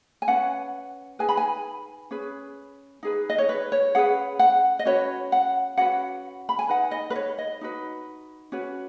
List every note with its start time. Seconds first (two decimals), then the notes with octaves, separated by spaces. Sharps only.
0.22 G#5
0.28 C#4 B4 F#5
1.19 D#4 G#4 B4 G#5
1.29 B5
1.37 G#5
2.11 C#4 G#4 B4
3.03 D#4 G#4 B4
3.30 D#5
3.38 C#5
3.49 B4
3.72 C#5
3.95 C#4 G#4 B4 F#5
4.39 F#5
4.79 D#5
4.85 C#4 F#4 B4 C#5
5.32 F#5
5.77 C#4 F#4 B4 F#5
6.49 B5
6.59 G#5
6.69 D#4 B4 F#5
6.91 D#5
7.10 B4
7.16 C#5
7.38 D#5
7.61 D#4 F#4 B4
8.52 C#4 F#4 B4